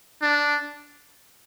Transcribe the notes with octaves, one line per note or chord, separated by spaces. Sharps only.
D4